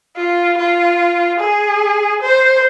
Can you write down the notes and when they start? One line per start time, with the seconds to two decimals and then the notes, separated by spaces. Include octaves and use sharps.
0.16 F4
0.58 F4
1.40 G#4
2.22 C5